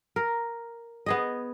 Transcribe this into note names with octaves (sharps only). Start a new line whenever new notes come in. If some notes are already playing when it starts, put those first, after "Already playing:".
A#4
B3 G#4 D#5